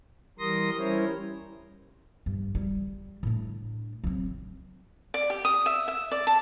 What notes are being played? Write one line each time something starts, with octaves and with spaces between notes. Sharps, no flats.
E3 G3 A#4 C6 D#6 A#6
G3 C#4 E4 A#4 C5 C#5
G2
G3
A2 D4
F#3 C4
D5
G4
D#6
E5
E5
D5
A5